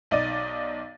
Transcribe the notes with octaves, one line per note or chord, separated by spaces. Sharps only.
B1 D#4 D5 D#5 A6 D#7